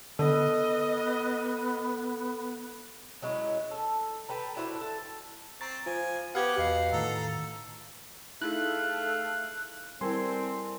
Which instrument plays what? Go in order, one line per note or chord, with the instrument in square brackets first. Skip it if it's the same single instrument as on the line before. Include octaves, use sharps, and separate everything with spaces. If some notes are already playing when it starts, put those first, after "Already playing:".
[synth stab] D3 [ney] B3 [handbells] A4 [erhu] D#5
[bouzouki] F#3 G#3 C#4 E4
A4
A4 B4 G5 A#5
D4 E4 F#4 C5
A4
[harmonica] C4 [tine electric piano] A#5 C#6 A6
[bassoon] F3 [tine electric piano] F4 [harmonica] G#5
[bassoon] B3 [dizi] G4 [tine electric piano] F5 G#6 [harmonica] F#5
[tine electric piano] E2 [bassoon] B2 [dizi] F5
[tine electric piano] A2 D#3 [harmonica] A4 A#5
[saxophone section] A3 [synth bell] D#4 E4 G#4 [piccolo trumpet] F5 [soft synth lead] F#6
[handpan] G3 A#4 [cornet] C4 [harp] E4 A4 G#5 [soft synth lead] C6